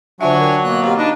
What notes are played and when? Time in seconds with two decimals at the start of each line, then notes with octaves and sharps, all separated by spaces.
0.21 D3 F#3 D4 F4 E5 G#5 C#6
0.40 A#4 G5
0.64 B2 A#3 B3 F#6
0.82 B2 C4 F4 G4 F5 A#5
0.98 D4 D#4 B4 D#5